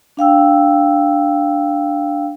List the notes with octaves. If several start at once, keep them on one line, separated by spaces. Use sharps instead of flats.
D4 F5 G5 E6